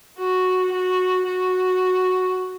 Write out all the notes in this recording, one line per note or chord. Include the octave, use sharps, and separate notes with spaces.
F#4
F#4
F#4